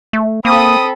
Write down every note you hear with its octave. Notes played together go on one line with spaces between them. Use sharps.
A3
A#3 C4 A4 B5 D#6